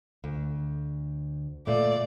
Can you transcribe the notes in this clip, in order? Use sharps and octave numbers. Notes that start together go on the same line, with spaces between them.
D2
A#2 A3 D5